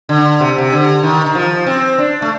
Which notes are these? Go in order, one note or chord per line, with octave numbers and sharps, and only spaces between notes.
D3
C3
C3
D3
D#3
D#3
F3
C4
D4
A3